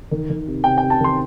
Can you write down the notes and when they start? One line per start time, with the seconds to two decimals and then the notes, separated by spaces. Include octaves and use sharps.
0.11 D#3
0.30 D#3
0.47 C3
0.64 C3 G5
0.78 C3 G5
0.90 A5
1.00 D#3 C6